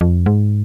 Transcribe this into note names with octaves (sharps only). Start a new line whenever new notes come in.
F2
G#2